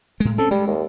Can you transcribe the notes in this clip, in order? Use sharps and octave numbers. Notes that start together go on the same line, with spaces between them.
A2 G#3
C4 C#4 A4
G3 G#3
D#2